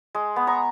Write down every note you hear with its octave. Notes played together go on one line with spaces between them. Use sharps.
G#3
B3
A#5 C#6